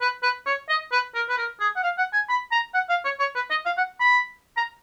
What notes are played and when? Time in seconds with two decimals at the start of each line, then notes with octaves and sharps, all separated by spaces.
0.01 B4
0.23 B4
0.46 C#5
0.69 D#5
0.92 B4
1.15 A#4
1.29 B4
1.38 A#4
1.60 G#4
1.76 F#5
1.83 F5
1.98 F#5
2.13 G#5
2.29 B5
2.52 A#5
2.75 F#5
2.89 F5
3.05 C#5
3.20 C#5
3.35 B4
3.50 D#5
3.66 F5
3.77 F#5
4.00 B5
4.57 A#5